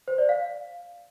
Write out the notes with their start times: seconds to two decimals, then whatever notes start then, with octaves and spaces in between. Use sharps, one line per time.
0.08 C5
0.18 D5
0.29 F5